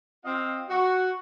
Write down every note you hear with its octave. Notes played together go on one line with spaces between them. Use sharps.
C4 F4 D#5 F5
F#4